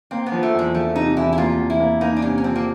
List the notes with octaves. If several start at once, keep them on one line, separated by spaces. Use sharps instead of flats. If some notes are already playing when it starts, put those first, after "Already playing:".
A#3 C4
B3
F3
A3
E2
G#3
F3 A3
C3 D#4
E2 E4
E4
A#3 F4
E2
E4
A#3
A#3 D#4
D4
C3 C#4
C#4
F3 C4
A#3